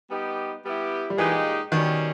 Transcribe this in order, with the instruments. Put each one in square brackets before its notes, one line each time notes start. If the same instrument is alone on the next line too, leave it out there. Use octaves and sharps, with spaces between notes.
[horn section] G3 B3 D#4 G4
G3 B3 E4 G4
[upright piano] G3
[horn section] A#2 G#3 D#4 G4 [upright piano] E3
[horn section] B2 G3 C#4 [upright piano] D#3